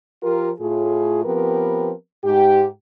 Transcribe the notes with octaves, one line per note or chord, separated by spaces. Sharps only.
F3 F4 G4 A#4
A2 F4 G#4
F3 B3 C4 G4 A#4 B4
G#2 G4